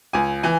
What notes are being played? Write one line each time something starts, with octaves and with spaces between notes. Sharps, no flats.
C#2 G#5
E3 G#5